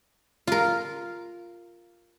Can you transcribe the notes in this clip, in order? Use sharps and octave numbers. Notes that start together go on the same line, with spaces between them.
F4 A#4